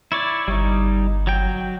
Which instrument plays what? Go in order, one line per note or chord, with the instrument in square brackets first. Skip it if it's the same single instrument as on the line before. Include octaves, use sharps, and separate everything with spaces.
[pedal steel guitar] E4 C#5 D5
[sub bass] G1 [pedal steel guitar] G3 D#4
[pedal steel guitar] F#3 G5